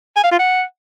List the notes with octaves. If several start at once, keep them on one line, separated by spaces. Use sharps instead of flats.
G#5
F5
F4
F#5